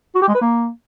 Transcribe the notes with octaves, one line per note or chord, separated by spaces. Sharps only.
F#4
G4
G#3
B4
A#3